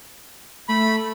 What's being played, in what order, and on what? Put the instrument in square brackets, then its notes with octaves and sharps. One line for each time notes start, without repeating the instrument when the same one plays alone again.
[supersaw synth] A3 [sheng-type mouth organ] B5